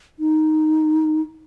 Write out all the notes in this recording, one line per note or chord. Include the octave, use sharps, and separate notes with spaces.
D#4